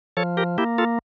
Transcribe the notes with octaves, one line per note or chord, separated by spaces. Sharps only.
F3 A4 C#5
G4 A#4
A#3 E4 G4
F4 A4